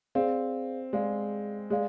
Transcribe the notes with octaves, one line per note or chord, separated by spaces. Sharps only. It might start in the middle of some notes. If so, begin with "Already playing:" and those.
C4 G#4 D5 F5
G#3 G#4 D5 F5
G#3 G#4 D5 F5